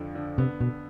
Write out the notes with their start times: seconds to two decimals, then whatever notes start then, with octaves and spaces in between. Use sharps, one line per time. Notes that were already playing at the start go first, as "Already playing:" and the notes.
Already playing: F2 D3 F3
0.15 D3
0.38 C3 B3
0.60 B2 B3